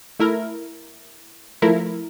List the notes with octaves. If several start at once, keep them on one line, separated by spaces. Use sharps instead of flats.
A3 E4 A#4
F3 A3 E4 A#4